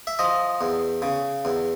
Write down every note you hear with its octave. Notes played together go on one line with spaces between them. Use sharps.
E5
F3 D#5
E2
C#3
E2